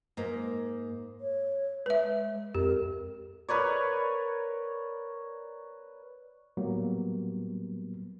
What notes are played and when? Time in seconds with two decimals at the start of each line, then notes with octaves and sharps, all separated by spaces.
0.17 G#2 A#3
1.21 C#5
1.86 G#3 B4 E5
2.55 F2 G4 A#4
3.49 A#4 B4 C#5 D5
6.57 A2 F#3 G3 A#3 B3